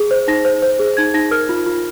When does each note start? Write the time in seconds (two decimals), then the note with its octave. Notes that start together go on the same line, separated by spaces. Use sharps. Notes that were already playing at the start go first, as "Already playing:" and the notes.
Already playing: G#4
0.11 C5
0.28 D#4 A#6
0.45 C5
0.62 C5
0.79 G#4
0.97 D#4 G#6
1.14 D#4 A#6
1.31 A#4 F6
1.49 F4
1.66 F4